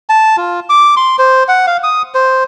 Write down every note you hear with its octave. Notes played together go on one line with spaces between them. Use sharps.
A5
F4
D6
C6
C5
F#5
F5
D#6
C5